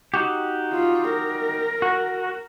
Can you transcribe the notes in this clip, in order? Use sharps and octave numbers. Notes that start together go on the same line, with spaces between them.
D#4 F#4 G4
F4
A#4
F#4